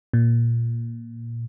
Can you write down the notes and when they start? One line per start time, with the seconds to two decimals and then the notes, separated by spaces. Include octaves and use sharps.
0.13 A#2